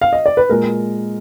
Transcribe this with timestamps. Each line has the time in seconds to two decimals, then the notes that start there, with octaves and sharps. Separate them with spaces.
0.01 F5
0.13 D#5
0.26 D5
0.37 B4
0.50 A#2 G#3 A#4